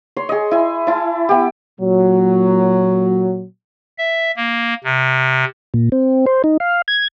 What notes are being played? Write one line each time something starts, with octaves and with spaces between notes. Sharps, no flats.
C#5 C6
G#4 D#5
E4 G#5
E4 A5
B3 G4
A#2 F#3
E5
A#3
C3
A#2
C4
C5
D#4
F5
G#6